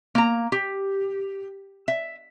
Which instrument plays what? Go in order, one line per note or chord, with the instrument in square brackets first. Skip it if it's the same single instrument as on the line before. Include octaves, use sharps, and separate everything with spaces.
[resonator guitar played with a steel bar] A#3 A#5
G4
E5